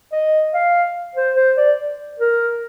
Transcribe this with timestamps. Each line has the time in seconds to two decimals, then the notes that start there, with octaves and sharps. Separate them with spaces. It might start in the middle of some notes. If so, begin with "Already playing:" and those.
0.12 D#5
0.54 F5
1.16 C5
1.36 C5
1.57 D5
2.19 A#4